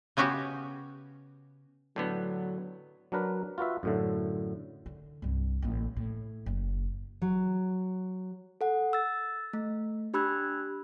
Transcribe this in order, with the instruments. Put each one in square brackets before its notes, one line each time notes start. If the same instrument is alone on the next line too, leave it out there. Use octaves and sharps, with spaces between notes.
[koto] C#3 B3 C#4 F#4 G4
[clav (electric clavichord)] A2 D3 B3 [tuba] F#3
[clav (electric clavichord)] F#3 D4 A#4 B4
F4 F#4 B4 E5
F#2 A2 D3
[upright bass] D3
C2 G2
A1 A#3
A2
F#1
[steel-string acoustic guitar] F#3
[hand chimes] A4 F#5
E6 A6
A3
D4 G4 B5 E6 F#6 G#6